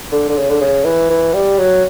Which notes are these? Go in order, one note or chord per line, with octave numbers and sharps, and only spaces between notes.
D3
D3
C#3
D3
C#3
E3
E3
G3
F#3